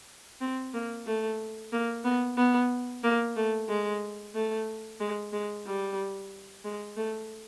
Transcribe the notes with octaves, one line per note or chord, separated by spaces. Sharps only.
C4
A#3
A3
A#3
B3
B3
A#3
A3
G#3
A3
G#3
G#3
G3
G#3
A3